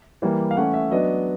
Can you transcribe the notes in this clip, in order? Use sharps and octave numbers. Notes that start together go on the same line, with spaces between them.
E3 G3 A#3
F5
E3 A3 C#4 F#5
E5
F#3 B3 D4 D#5